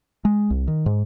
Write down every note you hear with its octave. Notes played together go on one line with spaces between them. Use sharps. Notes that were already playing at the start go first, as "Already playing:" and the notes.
G#3
C2
D#3
G#2